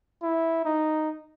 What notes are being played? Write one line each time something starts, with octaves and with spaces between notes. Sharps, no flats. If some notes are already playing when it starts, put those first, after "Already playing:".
E4
D#4